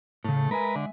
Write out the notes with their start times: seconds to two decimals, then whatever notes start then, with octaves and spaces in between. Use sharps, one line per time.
0.25 A2 C#3 A3
0.51 G#3 A#4 B4 E5 G#5
0.76 D3